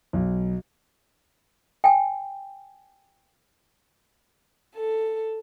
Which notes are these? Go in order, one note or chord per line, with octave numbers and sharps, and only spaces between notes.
B1
G5 G#5
A4